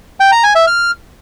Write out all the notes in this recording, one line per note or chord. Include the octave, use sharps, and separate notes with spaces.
G5
A#5
G#5
E5
F6